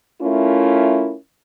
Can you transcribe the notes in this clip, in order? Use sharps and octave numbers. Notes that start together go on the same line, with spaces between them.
A3 C#4 E4 F4 A#4